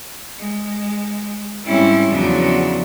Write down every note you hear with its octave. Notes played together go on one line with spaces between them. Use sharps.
G#3
G#2 G3 C4 C#4 E4
E2 C#3 F3 F#3 D4